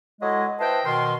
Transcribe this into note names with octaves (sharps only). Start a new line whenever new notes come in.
F#3 G#3 E4 A4 D#5
E4 B4 C5 D#5 G5 A5
B2 D#3 C6